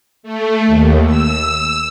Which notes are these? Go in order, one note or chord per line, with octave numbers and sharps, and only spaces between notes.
A3
D#2
E6